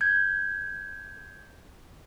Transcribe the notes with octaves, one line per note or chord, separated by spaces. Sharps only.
G6 G#6